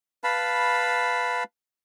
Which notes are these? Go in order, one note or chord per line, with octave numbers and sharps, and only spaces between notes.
B4 F5 A5 B5